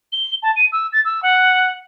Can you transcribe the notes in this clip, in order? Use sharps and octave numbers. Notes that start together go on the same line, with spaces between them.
G7
A5
D#7
E6
A6
E6
F#5